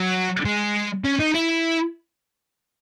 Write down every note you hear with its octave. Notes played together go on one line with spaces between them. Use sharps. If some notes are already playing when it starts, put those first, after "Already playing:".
Already playing: F#3
G#3
C#4
D#4
E4